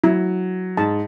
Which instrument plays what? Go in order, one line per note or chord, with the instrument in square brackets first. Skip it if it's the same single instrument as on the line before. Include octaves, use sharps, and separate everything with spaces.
[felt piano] F#3 [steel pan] E4
[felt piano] G#2 [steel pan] A5